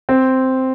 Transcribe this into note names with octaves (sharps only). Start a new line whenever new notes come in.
C4